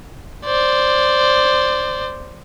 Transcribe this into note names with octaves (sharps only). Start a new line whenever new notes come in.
C5 D5